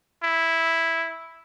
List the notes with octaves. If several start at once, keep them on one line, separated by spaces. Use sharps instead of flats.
E4